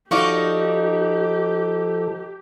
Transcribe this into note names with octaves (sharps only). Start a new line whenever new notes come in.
F3 D#4 F#4 G4 A4 D5 F5 C#6